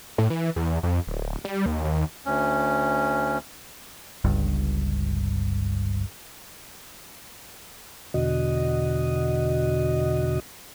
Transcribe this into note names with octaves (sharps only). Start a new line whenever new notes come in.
A2
E3
E2
F2
D1
G3
D#2
D#2
D2 C#4
G1 C#2 G2
E2 B2 D3 F#4 D#5